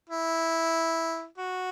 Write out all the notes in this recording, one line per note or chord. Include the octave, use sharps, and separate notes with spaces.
E4
F#4